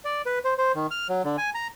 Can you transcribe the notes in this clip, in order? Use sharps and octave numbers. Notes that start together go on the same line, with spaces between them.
D5
B4
C5
C5
D#3
F6
F#3
D3
G#5
A#5